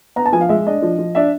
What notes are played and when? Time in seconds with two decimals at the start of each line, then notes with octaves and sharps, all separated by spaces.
0.16 B3 A#5
0.26 A5
0.33 F3 G#5
0.41 F5
0.49 G#3 E5
0.67 D4 D#5
0.82 F3
0.99 F3
1.15 D4 E5